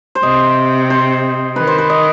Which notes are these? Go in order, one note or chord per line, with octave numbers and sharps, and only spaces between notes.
C5
C3 D#5
C5
D#3 B4
C5
B4
D#5